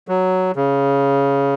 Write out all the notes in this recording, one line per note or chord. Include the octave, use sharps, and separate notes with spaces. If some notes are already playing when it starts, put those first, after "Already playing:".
F#3
C#3